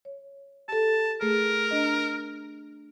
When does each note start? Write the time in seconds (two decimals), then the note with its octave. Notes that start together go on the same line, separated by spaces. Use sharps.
0.05 C#5
0.68 G4 A4 A5
1.21 A3 G#4 A#4
1.71 D4 D#5